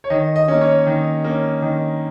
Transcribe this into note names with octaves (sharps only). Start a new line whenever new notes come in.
C#5
D#3 D#5
D#5
A#3 C#4
C#5
D#3
A#3 C#4
D#3